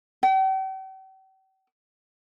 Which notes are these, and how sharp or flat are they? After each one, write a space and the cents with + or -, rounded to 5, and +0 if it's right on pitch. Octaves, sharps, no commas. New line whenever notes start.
G5 -45